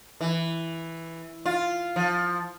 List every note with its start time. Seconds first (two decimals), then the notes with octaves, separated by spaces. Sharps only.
0.21 E3
1.46 F4
1.96 F3